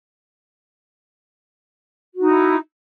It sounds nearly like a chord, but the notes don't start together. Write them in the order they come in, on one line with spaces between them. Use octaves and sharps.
F#4 D#4 E4